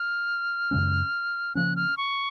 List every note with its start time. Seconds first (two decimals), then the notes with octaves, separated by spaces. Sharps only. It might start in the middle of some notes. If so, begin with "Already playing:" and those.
Already playing: F6
0.71 F#2 C#3 G#3 C#4
1.55 C#3 F3 A#3 C#4 F#6
1.76 F6
1.97 C#6